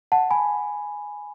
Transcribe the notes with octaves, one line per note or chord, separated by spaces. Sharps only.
F#5 A5
G#5 B5